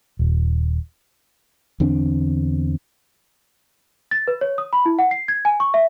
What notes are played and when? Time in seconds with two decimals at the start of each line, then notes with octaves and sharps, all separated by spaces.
0.19 D#1
1.80 E2 D3 C4 D4
4.11 A6
4.28 B4
4.41 C#5
4.58 D#6
4.73 B5
4.86 E4
4.99 F#5
5.11 C7
5.28 G#6
5.45 G#5
5.60 C#6
5.74 E5